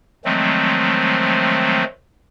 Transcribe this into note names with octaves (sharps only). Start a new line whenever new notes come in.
D#3 F3 F#3 G#3 A3 C4